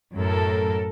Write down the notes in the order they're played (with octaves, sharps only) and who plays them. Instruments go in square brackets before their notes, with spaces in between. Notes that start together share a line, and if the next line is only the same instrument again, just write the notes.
[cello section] F#2 A2 A4 A#4